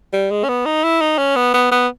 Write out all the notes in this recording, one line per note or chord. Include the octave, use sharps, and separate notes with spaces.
G3
G#3
C#4
B3
D#4
E4
D#4
C#4
B3
B3
B3